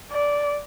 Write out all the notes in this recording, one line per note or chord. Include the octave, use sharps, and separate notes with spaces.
D5